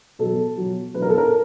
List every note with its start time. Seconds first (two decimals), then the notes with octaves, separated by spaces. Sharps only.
0.19 B2 F#3 A4
0.57 B2 F#3
0.94 B2 F#3 B4
1.02 A#4
1.10 A4
1.18 A#4